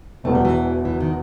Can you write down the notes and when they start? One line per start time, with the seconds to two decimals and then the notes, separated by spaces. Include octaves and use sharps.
0.24 E1 E2 B2 A3
0.35 G3
0.45 E3
0.85 E3
1.01 D#3